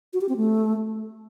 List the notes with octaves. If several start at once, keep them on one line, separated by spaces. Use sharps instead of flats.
F#4
G4
C4
A3